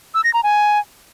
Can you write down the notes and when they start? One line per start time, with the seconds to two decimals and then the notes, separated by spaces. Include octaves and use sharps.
0.14 E6
0.24 A#6
0.34 A#5
0.43 G#5